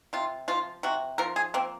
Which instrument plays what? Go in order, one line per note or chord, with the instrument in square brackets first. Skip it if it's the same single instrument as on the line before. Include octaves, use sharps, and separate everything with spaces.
[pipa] C3 F4
F3 F4
C3 F#4
F3 A#4
G#4
A#3 C4